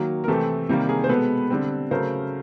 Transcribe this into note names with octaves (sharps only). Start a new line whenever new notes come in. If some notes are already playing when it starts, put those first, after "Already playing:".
Already playing: D#3 F#3 A#3
A#4
C3 E3 A3 C4 G4 A4
C3 D#3 G3 A#3
G#4 A#4
C5
B2 G#3 B3 A4 B4
D3 G3 C4
C#3 F#3 A3 A#4 C5